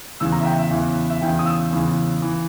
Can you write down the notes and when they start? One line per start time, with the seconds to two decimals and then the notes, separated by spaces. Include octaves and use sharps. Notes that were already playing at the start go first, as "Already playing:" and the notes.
0.20 E2 C#3 E3 E6
0.32 A#5
0.41 E5
0.45 G5
0.59 E5
0.71 E2 C#3 E3
1.10 E5
1.21 E2 C#3 E3 G5
1.39 D#6
1.46 E6
1.71 E2 C#3 E3
2.22 E3